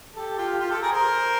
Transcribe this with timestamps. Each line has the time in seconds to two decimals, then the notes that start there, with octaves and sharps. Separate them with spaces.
0.16 G4 A4
0.38 F4 G4
0.59 F4 G4
0.71 G4 A4
0.82 G#4 A#4
0.92 A#4 C5